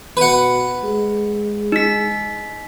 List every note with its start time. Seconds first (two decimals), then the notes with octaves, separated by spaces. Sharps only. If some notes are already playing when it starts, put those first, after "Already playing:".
0.17 B2 B4 F#5
0.84 G#3
1.72 D#4 B6